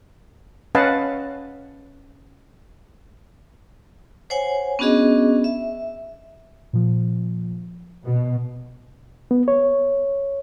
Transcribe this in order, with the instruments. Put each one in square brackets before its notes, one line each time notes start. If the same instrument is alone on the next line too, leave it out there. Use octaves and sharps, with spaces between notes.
[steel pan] C#4 B4 D#5 F5 F#5 A5
[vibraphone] C5 C#5 F#5 G#5
B3 C#4 D4 F#4 G#4 D#5
E5
[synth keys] A#2 F3
[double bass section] B2
[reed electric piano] B3
C#5